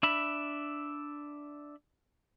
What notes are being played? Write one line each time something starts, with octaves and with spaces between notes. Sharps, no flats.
D4 E5 B5